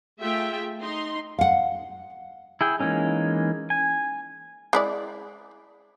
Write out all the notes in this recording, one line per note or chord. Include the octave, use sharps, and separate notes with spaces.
A3 F4 G#4 E5 G5
D#4 C6
F5 F#5
E4 G#4 G5
E3 G#3 A#3 C#4 D#4
G#5
G#3 E4 D5